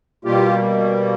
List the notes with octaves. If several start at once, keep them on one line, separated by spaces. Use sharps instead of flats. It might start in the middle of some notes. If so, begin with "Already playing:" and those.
B2 G3 A#3 F4 G4